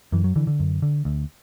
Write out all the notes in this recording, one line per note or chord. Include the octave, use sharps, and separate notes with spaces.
F#2 E3
F#3
D3 E3
D3
F#2
D3
D2